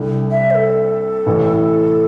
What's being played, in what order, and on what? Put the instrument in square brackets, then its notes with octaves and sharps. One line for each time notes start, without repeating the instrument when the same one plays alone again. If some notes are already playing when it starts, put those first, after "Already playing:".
Already playing: [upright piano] C2 C3 G3 D4 A4
[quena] E5
C5
A4
[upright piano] A1 A2 E3